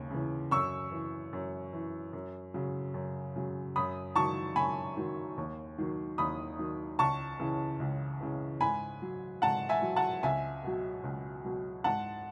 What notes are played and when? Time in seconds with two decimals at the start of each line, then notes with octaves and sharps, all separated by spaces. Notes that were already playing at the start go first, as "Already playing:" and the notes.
Already playing: D#2 C#3
0.11 C#3 E3
0.51 F#2 C#6 E6
0.92 E3
1.33 F#2
1.73 E3
2.13 F#2
2.54 C#3 F#3
2.94 F#2
3.36 C#3 F#3
3.76 F#2 B5 D#6
4.15 D#3 F#3 A5 C#6
4.56 F#2 G#5 B5
4.97 D#3 F#3
5.37 D#2
5.78 D#3 F#3
6.18 D#2 B5 D#6
6.59 D#3 F#3
6.99 C#2 A5 C#6
7.40 C#3 E3
7.80 C#2
8.21 C#3 E3
8.61 G#2 G#5 B5
9.02 F#3
9.42 G#2 F#5 A5
9.69 E5 G#5
9.82 F#3
9.96 F#5 A5
10.23 C#2 E5 G#5
10.64 B2 F#3
11.04 C#2
11.45 B2 F#3
11.84 G#2 F#5 A5